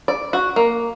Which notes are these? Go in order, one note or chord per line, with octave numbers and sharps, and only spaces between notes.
D5
F#4
A#3